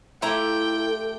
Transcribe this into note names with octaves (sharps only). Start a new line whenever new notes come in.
A3 E4 F4 G4 A4 G5 A#5